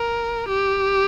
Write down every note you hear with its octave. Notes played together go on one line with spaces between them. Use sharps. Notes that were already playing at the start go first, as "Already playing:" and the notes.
Already playing: A#4
G4